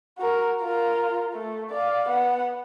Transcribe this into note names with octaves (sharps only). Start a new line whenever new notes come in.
F#4 A#4
F4 A#4
A3
D5 F5
B3 F#5